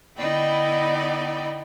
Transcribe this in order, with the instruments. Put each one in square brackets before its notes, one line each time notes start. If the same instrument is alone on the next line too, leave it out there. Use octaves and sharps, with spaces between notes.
[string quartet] D3 B3 D#4 E4 D5 G5